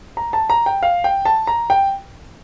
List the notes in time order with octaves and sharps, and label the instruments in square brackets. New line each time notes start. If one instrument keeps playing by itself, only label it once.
[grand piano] A#5
A5
A#5
G5
F5
G5
A5
A#5
G5